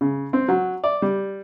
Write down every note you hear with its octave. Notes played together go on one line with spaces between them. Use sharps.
C#3
C4
F#3
D5
G3